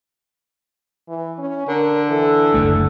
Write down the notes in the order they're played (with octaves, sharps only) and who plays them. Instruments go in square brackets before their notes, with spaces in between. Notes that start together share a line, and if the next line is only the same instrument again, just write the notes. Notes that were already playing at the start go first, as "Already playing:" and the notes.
[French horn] E3
C#4
[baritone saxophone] D3 [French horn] A#4
[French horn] E3 [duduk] A4
[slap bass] F#1 D2 A3